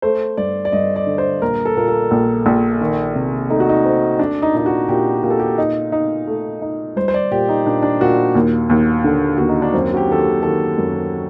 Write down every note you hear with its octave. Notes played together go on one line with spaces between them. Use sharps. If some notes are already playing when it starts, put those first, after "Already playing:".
A3 C5
G2 D5
D5
G2 D#5
D5
D3
C5
A#1 A#4
A4
A#2 A#4
A4
A#1
A#1
D#3
C3
A3 D#4
F#4
D#4
A3 C4
A3 D4
D#4
A#2 D#4
F#4
A#2 G4
A#2 G4
A4
G4
D#4
D#4
A3
D#4
G3 C5
C5
D5
A#2 G4
D#4
A#2 D4
D4
A#2 F#4
D#2
D#2
D3
D#2 F#4
D#4
D4
F#2 C4
F#4
G4
D#3 A4
G4
D#3 A4
F#2